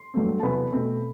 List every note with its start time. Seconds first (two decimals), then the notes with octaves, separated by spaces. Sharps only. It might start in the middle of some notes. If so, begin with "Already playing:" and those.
Already playing: C6
0.14 G2 F#3 A3 C4
0.40 A5
0.43 E2 C3 F#3 B3 B5
0.72 B2 A3 C4